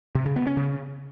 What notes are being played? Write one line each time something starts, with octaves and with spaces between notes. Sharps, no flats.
C3
C#3
B3
C#4
C#3